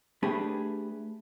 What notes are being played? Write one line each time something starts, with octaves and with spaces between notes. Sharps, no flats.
A3 D4 G4 G#4 B4